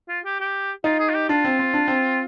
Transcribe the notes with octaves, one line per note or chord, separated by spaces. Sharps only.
F4
G4
G4
D#4 F4
G#4
F4
G4
D4 F4
C4
C4
D4
C4